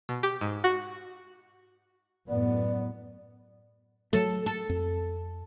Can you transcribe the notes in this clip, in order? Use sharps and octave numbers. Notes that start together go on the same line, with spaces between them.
B2
G4
G#2
F#4
F#2 A2 B3 D5
F#3 A3 A4
A4
F2